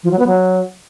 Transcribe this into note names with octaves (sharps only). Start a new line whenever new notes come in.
F3
F#3
B3
F#3